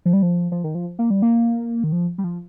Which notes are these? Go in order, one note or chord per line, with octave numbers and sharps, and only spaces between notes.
F3
G3
F3
F3
D#3
F3
A#3
G3
A#3
D#3
F3
G3
F3